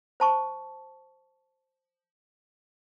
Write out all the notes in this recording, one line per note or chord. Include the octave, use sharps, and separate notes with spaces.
C5 A5 C#6